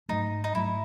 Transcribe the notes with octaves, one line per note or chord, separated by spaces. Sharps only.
G#2 F#3 A3 D#4
D#4
G#2 F#3 A3 E4